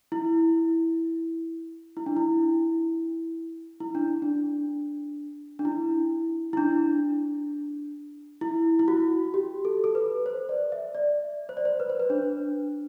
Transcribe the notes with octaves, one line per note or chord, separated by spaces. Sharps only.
E4
E4
D4
E4
E4
D4
D4
D4
E4
E4
D4
E4
E4
F#4
G4
A4
A4
B4
C5
D5
E5
D5
C5
D5
C5
B4
C5
B4
D4